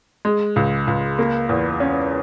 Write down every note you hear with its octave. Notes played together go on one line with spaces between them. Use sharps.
G#3
C#2
C#2
A#3
E2
C#4